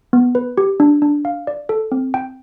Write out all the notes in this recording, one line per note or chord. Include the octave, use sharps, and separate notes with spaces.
B3
B4
G4
D4
D4
F5
D5
A4
C4
G5